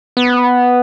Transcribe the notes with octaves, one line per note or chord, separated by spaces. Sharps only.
B3